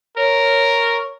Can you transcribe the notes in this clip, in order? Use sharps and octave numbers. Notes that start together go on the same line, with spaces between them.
A#4 C#5